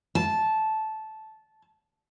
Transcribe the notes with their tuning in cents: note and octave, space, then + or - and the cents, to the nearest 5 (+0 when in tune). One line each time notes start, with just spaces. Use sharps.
A5 -10